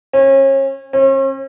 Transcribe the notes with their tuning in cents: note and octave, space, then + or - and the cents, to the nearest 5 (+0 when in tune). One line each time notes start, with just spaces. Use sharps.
C#4 -35
C#4 -45